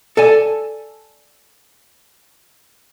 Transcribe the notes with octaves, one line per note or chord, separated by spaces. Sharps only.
A4 D5 G#5 A5